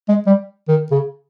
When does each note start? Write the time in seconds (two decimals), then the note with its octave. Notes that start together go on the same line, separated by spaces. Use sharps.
0.09 G#3
0.27 G3
0.68 D#3
0.92 C#3